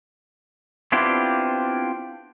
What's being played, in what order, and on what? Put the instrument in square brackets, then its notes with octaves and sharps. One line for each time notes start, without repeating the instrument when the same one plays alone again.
[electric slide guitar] B3 C4 D4 E4 F4 G4